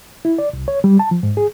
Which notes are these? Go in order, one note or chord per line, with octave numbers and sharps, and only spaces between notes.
E4
D5
C2
C#5
G3
A5
F3
G#2
G#4